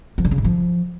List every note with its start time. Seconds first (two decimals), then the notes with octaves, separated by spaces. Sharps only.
0.18 F3
0.25 D3
0.31 C#3
0.38 G#2
0.45 F3